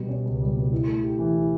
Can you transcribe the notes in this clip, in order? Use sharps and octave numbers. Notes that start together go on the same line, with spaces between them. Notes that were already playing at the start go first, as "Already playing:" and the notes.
Already playing: B2 G3
C#4
C#2
G3
B2
E4
A3
G4
E3
E4